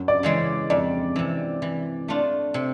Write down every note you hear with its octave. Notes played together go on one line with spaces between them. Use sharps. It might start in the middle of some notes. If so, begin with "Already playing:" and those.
Already playing: F#2
D5
C#3 E3 G#3
F2 D5
C3 E3
E3
A3 D4 F4
C3